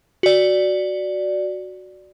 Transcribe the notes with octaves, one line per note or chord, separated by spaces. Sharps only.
F#4 D5